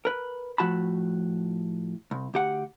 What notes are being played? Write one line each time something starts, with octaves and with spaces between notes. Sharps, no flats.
A#4 B4
A2 F3 F#4 A5 B5
C2
D2 G4 F#5